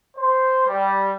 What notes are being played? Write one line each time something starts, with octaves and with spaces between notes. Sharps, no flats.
C5
G3